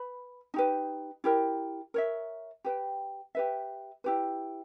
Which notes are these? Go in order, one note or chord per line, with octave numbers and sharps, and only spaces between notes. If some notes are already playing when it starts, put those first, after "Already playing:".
Already playing: B4 B5
D#4 G4 B4
E4 G4 A#4
A#4 C#5 E5
G4 B4 G5
G4 B4 E5
E4 G4 B4